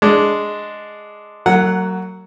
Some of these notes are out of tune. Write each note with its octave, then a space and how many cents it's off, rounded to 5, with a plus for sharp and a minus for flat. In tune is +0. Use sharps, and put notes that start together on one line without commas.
G#3 +0 D4 +0
F#3 +15 A#3 -40 F#5 +0